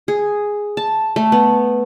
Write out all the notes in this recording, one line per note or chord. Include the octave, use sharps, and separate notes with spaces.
G#4
A5
A3
B3